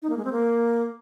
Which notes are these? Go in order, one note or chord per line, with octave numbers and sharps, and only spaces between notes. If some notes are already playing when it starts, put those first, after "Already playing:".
D#4
A#3
G#3
C4
A#3